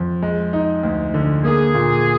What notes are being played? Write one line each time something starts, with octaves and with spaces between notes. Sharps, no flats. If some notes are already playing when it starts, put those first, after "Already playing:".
Already playing: F2
G#3
D#4
D2
D3
A#3 G#4
A#2